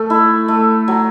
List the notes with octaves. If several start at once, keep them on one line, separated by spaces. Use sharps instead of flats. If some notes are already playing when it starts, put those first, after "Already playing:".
Already playing: A3 A4
E4
A3
F#3